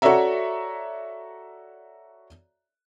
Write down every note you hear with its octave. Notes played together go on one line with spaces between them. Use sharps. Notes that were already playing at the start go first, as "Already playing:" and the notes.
F#4 A4 C#5 D5 E5 A#5